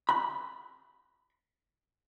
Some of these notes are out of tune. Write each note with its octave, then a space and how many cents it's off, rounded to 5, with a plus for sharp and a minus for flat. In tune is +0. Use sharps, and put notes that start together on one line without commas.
B5 -10